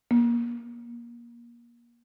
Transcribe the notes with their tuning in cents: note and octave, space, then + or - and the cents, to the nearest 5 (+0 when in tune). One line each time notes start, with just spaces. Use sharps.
A#3 +25